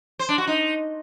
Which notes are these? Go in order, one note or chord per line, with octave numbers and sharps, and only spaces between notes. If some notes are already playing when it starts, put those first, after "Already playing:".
C5
D4
F#4
D#4